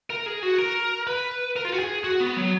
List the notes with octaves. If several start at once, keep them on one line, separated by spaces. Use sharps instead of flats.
A#4
G#4
F#4
A#4
B4
A#4
F4
F#4
G#4
F#4
B3
F#3